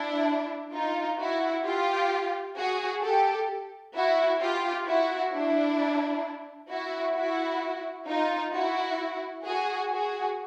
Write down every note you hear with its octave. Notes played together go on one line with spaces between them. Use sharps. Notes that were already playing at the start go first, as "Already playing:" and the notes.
Already playing: D4 E4
D#4 F4
E4 F#4
F4 G4
F#4 G#4
G4 A4
E4 F#4
F4 G4
E4 F#4
D4 E4
E4 F#4
E4 F#4
D#4 F4
E4 F#4
F#4 G#4
F#4 G#4